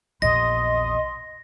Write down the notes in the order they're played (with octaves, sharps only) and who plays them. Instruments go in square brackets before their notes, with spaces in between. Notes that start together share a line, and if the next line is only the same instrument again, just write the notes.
[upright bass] A#1 E2 [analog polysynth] D#5 [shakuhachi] C6 [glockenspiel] A#6